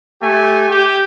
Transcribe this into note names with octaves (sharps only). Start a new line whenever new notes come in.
A3 G4 G#5
G4